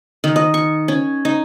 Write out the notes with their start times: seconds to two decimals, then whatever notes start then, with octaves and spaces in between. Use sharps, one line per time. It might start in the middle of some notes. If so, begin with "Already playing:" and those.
0.24 D#3
0.36 D#5
0.54 C#6
0.88 C#4
1.25 D#4